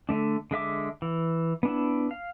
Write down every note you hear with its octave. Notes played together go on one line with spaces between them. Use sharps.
D3 A3 D4
D3 G#3 E5 D6
E3
B3 D4 E4
F5